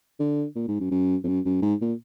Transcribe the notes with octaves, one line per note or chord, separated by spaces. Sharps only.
D3
A#2
G#2
F#2
F#2
F2
F#2
F#2
G#2
A#2